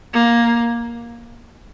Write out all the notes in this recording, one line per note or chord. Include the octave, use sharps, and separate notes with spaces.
A#3